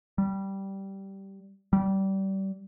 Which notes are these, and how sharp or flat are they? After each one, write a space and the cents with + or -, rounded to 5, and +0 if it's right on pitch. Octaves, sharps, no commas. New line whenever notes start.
G3 -10
G3 -25